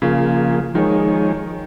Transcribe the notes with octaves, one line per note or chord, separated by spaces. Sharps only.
C#3 F3 A#3 F4 G#4
D#3 F3 G#3 D#4 G#4 C#5